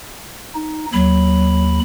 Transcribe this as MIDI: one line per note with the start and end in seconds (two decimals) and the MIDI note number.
0.55 0.86 63
0.93 1.80 39
0.93 1.80 54
0.93 1.80 83